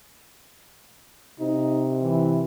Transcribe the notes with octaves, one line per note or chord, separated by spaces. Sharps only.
C3 D#4
E3